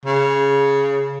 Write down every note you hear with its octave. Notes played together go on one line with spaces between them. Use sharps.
C#3